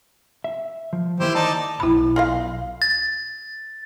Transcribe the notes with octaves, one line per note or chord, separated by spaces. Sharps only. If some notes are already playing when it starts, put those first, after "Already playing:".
E5
F3
D#3 E3 A#3 E4 G4 C5
D#4 D5 A5
B1 E4 B5
F4 D#5 F5
A6